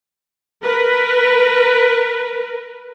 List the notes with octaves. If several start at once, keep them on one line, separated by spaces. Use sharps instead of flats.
A#4 B4